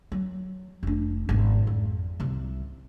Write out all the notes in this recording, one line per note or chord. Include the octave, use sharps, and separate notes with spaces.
F#3
F1 D4
G#1 B2
F2
C2 C3